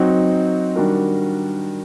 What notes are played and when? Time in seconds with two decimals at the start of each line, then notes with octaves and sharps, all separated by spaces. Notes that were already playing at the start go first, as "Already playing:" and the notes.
Already playing: F#3 C4 D#4 F#4
0.76 D#3 G3 D4 F#4 A#4